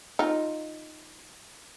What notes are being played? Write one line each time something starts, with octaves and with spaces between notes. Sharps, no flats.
D#4 F4